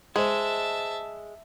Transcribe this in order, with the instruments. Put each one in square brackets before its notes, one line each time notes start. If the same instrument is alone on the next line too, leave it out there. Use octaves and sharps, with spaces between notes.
[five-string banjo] G#3 [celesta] G#4 C5 [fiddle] E5 A5